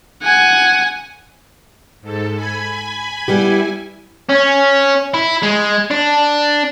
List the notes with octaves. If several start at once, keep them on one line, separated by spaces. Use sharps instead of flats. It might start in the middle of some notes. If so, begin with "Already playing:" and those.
F#5 G#5
G#2 A4
G#5 B5 G#6
G3 B3 E4 G4 G#5
C#4
E4
G#3
D4